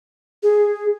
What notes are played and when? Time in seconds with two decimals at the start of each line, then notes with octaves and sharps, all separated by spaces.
0.43 G#4